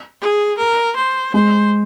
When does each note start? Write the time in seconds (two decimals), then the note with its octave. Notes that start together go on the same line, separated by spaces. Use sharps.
0.21 G#4
0.58 A#4
0.96 C5
1.34 G#3 C5